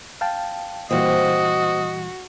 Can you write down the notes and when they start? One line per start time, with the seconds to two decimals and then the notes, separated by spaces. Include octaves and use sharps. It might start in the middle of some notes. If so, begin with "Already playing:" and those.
0.21 F5 G5 A5
0.91 A#2 E3 G3 A#3 C4 F#4 D#5